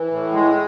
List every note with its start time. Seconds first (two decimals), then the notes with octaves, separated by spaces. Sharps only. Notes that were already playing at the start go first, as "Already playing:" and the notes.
Already playing: E3
0.11 A2
0.32 G#3